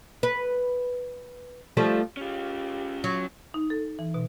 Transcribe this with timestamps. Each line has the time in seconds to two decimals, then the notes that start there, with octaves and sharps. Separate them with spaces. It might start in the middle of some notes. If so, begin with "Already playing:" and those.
0.23 B4
1.77 F3 G3 A3
2.17 C#4 F4 G4
3.04 F#3
3.54 D#4
3.70 A4
3.99 E3
4.14 B2